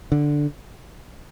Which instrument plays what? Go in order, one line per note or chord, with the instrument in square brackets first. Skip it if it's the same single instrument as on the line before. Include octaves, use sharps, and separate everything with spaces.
[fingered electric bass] D3